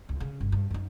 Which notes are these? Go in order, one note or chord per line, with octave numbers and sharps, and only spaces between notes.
C#2
C#3
G1
G2
F#2 D#4